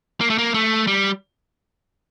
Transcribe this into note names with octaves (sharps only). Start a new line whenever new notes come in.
A#3
A3
A#3
A3
G3